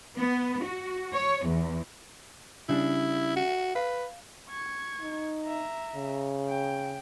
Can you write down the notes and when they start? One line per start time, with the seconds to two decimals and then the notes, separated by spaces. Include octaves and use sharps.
0.16 B3
0.64 F#4
1.13 C#5
1.47 E2
2.69 C#3 G3 D4 E4
3.36 F#4
3.75 B4 F5
4.50 C#6 G#6
5.00 D#4
5.44 E5 A#5
5.96 C#3
6.48 G5